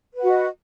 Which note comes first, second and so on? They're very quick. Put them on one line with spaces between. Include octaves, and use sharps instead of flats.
B4 F#5 F#4 D#5